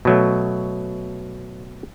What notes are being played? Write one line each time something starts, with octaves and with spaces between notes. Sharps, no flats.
B2 F#3 A3